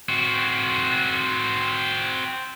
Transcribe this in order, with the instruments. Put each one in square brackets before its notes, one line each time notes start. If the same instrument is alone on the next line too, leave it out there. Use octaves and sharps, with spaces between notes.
[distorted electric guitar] C4 F#4